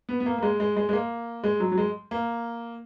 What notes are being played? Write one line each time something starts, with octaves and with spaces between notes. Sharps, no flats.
B3
B3
A#3
A#3
G#3
G#3
G#3
G#3
A#3
G#3
F#3
F#3
G#3
A#3